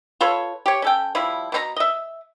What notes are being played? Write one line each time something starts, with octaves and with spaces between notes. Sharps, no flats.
F4 A4 B4 C#5
G4 C#5
C#4 A4 G5
F3 G3 E4
B2 C4 A#5
D#5 E5